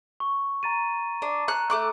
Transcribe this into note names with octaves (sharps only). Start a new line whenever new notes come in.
C#6
A#5 A6 D#7
D4
A#5 F#6 C#7
A3 D6 F#6